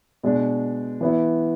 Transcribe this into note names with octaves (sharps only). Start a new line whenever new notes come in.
B2 G#3 D4
E3 B3 E4